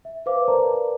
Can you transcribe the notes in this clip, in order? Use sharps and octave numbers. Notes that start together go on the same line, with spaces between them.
E5
B4 C5 F5 D6
A#4 B4 D5 A5 A#5